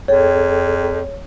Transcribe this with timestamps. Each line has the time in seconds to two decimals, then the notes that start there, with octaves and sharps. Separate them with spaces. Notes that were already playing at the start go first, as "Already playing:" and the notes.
0.08 F2 G#4 A4 C#5 G5